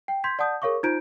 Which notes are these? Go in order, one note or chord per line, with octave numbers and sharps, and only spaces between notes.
G5
C6 G6 G#6 B6
D5 F#5 A5 D#6 G6
G#4 A#4 C#5 F5 C#6 D6
D#4 F4 C5 A#5 G6 D7